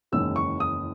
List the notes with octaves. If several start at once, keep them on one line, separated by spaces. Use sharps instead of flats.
F#1 E2 D#3 G#3 C#4 E6
C#6
D#6